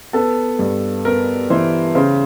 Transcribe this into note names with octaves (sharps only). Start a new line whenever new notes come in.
B3 A4
G2
B3 A#4
E3 C5
C#3 C5